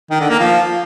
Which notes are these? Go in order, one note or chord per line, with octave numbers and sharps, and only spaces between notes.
D#3
D3
A#3
F3